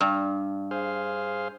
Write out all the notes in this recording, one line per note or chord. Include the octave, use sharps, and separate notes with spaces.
G2
G#4 C5 F5